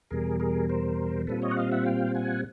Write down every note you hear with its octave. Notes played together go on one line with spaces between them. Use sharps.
E2 B2 G3 G#4 A#4
G#4 A#4
A#4 C5
A#2 G3 C4 F4 A4 B4
C#5 D#5
F#5
D#5 F5
E5 F#5
F5 G5
F#5 G#5